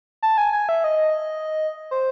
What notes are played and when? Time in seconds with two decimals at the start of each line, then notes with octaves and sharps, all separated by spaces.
0.23 A5
0.38 G#5
0.53 G#5
0.69 E5
0.84 D#5
1.91 C5